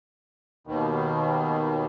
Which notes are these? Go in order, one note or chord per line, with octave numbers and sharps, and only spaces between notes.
D#2 B2 D#3